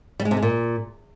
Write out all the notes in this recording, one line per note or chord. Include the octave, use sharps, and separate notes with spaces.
G3
G#3
C3
G#3
A#2